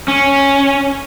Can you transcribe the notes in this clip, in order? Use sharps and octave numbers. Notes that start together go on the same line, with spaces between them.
C#4